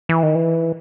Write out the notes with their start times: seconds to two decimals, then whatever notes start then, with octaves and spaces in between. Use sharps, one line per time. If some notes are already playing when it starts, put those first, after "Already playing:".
0.09 E3
0.23 D#3
0.35 E3